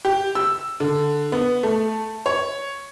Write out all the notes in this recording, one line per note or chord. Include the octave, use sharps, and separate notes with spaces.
G4
E6
D3
B3
A3
C#5